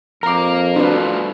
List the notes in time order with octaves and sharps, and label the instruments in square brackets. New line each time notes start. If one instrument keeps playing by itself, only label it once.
[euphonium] F2 [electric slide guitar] A#4 F5 [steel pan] A#5 D6
[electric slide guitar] A2 G3 F4 [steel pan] D4 F#4 B4